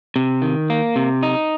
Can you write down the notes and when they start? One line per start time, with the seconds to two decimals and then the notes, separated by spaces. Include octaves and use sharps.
0.16 C3
0.42 D#3
0.70 A#3
0.96 C3
1.23 D#4